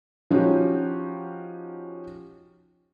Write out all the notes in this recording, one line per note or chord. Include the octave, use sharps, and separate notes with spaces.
F3 C#4 D#4 F#4 G4